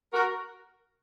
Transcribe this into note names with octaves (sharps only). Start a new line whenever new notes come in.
F#4 A#4